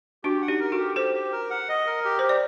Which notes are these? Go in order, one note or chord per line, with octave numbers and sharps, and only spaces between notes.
D4 F#4 G4
F#5
D#4 G4
A#4
F#4 A4
G4
G4 A4 C5
G4
A#4
F#5
D#5
A#4
G4
G4 C5
D5